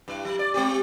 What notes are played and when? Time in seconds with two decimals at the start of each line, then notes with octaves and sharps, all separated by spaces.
0.08 G2 E4
0.25 F#3
0.39 D5
0.54 G#3 C4 G4